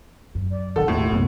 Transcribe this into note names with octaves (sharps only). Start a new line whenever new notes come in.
F#2
D5
F#1 C3 D#3 A4 F#5
E1 D#2 A2 F4
C2 F#2 A#3 B3